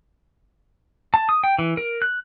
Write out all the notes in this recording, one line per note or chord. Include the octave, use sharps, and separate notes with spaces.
A5
D#6
G5
E3
A#4
F#6